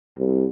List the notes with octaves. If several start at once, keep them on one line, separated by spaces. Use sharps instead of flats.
C2